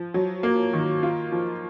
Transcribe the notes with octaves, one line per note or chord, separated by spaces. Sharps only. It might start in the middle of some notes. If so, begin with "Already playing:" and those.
Already playing: F3
F#3
A#3
D#3
F4
F3